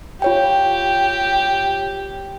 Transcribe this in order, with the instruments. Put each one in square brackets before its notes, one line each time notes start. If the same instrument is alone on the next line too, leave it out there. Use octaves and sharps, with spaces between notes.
[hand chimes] F4 C#5 G5 [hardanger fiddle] G4